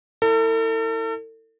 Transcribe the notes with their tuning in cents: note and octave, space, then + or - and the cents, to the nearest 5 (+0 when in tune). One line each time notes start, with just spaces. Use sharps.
E4 -20 A4 +40